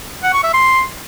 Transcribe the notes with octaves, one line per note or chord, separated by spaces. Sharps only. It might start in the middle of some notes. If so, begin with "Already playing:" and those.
F#5
C#6
E5
C6